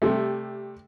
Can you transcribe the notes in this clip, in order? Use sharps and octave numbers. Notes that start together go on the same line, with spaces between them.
C3 G3 A3